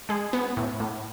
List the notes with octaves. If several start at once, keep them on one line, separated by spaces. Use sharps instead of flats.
G#3 G#4
B3
A2
A2